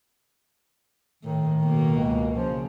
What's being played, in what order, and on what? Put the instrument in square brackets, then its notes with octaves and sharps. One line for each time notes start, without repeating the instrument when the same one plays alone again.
[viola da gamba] A2 [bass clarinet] D#3
[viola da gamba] B2 A#3
[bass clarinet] C#2
[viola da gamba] C#3 [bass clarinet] F3